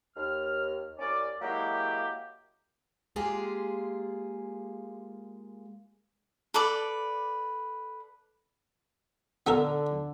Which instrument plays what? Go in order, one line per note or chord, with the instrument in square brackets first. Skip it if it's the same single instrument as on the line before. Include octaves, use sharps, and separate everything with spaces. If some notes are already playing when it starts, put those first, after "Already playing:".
[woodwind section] D#2 F6
C2 C#4 D5
F#3 G#3 A#3 E4 G4
[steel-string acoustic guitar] G#3 A#3 F4 G4 G#4
[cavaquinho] A4 B4 D5 D6
[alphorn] D3 [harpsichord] B3 A4 A#4